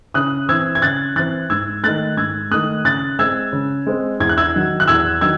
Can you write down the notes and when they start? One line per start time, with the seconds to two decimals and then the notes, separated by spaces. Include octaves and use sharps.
0.14 C#3 D#6 F#6
0.49 E3 C4 E6 G#6
0.75 G#6
0.82 C#3 F#6 A6
1.16 E3 C4 F#6 A6
1.50 G#2 E6 G#6
1.84 D#3 A3 F#6 A6
2.17 G#2 E6 G#6
2.51 D#3 A3 D#6 F#6
2.85 C#3 F#6 A6
3.19 G#3 C4 E6 G#6
3.53 C#3
3.87 G#3 C4
4.20 E2 G#6
4.29 F#6
4.37 E6 G#6
4.54 D#3 F#3
4.80 F#6
4.88 E2 E6 G#6
5.21 D#3 F#3 E6 G#6